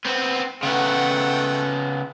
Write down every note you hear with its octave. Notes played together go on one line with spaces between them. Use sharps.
B3 C4
C#3 A3 B3 F#5 G5